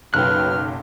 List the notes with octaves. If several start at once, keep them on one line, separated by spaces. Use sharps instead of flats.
F#1 B1 F#3 B4 G5 F6 F#6